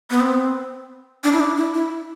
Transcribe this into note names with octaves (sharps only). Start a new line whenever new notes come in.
B3
C4
D4
E4
D4
E4
E4